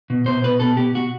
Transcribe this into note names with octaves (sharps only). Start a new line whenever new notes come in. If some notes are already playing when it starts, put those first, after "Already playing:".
B2
B2 C5
B2 B4
B2 A4
B2 G4
B2 F#4